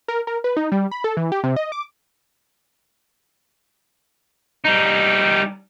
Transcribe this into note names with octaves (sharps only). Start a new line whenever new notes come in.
A#4
A#4
B4
D#4
G3
B5
A4
E3
G4
C3
D#5
D6
G3 D#4